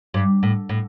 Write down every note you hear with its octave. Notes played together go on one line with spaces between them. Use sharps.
G2
A2
A2